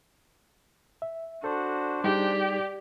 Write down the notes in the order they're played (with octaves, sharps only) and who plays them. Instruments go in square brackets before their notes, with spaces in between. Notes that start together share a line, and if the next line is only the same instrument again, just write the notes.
[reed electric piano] E5
[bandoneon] D4 C5 [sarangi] F#4 [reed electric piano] A4
[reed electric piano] G3 D#4 G#4 [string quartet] G4 [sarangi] D5